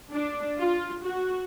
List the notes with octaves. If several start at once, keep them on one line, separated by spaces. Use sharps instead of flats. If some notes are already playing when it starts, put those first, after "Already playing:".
D4
F4
F#4